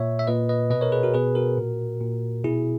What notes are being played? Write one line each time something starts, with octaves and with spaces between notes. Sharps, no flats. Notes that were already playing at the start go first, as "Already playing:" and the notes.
Already playing: A#2 C#5 E5
E5
A#2 B4 D#5
B4 D#5
B2 B4 D#5
A#4 C#5
G#4 B4
F#4 A#4
B2 G#4 B4
F#4 A#4
A#2
A#2
B2 E4 G#4